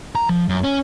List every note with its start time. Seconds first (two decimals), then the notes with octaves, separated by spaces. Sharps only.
0.15 A#5
0.29 F3
0.49 F#2
0.64 C#4